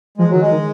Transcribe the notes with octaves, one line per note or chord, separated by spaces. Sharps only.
F3 G#3
D#3 F#3
G#3
D#3